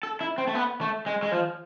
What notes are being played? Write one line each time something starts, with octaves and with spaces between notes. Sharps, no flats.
A4
E4
C4
A3
B3
A3
G#3
G#3
F3